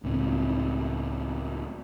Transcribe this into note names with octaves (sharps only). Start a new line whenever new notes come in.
C#2 A2 C4